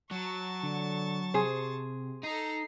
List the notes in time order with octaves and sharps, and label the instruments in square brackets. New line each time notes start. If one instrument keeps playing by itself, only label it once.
[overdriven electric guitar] F#3 [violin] A5 C#6
[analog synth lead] D3
[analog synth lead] C3 [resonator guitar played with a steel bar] G#4 C5
[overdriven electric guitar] D#4 [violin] A4 A#5 [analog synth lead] C7